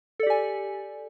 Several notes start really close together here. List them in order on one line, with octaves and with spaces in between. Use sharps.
A4 D5 G4 G#5